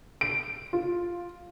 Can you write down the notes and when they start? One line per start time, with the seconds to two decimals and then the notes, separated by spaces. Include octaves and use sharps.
0.21 D7
0.73 F4